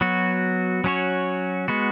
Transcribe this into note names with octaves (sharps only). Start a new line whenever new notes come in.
F#3 B3 F#4
F#3 C#4 F#4 C#5
G#3 B3 F#4